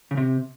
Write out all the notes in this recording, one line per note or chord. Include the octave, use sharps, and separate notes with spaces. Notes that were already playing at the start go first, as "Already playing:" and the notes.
C#3
C3